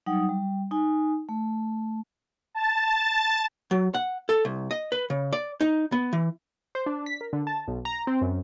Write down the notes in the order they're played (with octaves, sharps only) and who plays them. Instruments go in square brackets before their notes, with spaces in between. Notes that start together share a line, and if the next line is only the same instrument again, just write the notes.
[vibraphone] F#3 G3 D#4 F#5 D#6
G3
D#4 G#5
A3
[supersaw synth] A5 A6
[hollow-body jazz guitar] F#3
F#5
A4
C2
D#5
B4
C#3
D5
D#4
B3
E3
[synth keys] C5
D4
B6
A#4
D3
A5
B1
A#5
C4
F#2